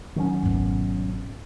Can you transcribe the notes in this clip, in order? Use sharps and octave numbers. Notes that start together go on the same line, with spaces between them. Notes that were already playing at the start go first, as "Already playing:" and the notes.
D#3 F#3 C#4
G#1 B2